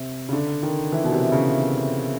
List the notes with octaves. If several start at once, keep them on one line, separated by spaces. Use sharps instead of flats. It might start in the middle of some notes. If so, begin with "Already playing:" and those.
Already playing: C3
C#3
D3
D#3
E3
B2
C3
C#3